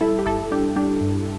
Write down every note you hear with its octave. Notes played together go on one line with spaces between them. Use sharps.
G3 E4 A4
G4
G1 E4 A4
G3 D4 G4
G3 D4 G4
G2